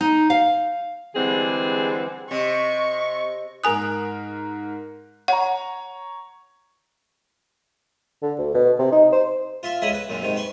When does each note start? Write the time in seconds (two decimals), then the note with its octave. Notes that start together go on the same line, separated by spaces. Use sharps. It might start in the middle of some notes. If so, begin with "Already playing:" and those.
0.01 D#4
0.30 F5
1.14 D3 E3 G3 G#3 C4 G#4
2.31 C3 D#5 C#6
3.64 G#2 A#4 G#5 D#6 F#6
5.28 C#5 F#5 A#5
8.23 D3
8.39 D2
8.54 B2
8.79 C3
8.92 D#4
9.13 C5
9.63 F4 E5 C6
9.82 C#2 C#3 G#4 D#5 E5 B5
9.93 B4
10.09 F#2 A#2 D3
10.22 G#2 C3 D#3
10.36 B4 C6 C#6